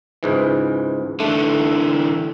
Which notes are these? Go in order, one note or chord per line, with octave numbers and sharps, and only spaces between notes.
C#2 G#2 E3
D3 E3 A3